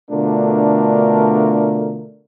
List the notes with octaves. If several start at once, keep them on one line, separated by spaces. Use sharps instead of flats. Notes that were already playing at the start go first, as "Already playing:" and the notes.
B2 D3 A3 D4 F4 A#4